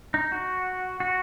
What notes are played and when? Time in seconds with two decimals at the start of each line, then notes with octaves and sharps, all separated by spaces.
0.14 D#4
0.32 F#4
1.00 F#4